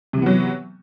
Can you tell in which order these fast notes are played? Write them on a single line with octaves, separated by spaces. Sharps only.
C3 E3 B3 F#3